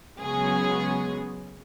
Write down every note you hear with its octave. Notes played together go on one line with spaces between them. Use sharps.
C#3 F#3 G#3 B3 C#4 G#4